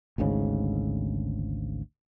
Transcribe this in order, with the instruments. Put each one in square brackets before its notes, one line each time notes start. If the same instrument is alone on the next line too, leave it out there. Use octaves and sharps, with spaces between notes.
[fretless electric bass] G#1 D2 G#2 C#3